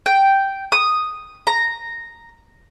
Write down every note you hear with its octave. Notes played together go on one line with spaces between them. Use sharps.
G5
D#6
A#5